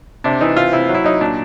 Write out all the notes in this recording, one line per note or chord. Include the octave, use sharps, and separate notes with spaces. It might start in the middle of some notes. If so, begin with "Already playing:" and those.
C3 D4
E3 D#4
C3 F4
C3 E4
F#3
E4
F#3 D#4
A#2 D4